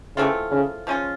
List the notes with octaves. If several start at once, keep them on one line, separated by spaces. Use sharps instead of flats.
C#3 E3 A3 C4 F4
C#3
F3 G#3 C#4 F4